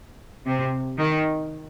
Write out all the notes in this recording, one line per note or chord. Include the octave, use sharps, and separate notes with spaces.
C3
D#3